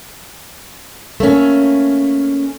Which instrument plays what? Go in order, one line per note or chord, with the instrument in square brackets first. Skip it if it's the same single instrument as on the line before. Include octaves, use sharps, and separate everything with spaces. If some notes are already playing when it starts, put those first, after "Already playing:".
[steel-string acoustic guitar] A3 A#3 C#4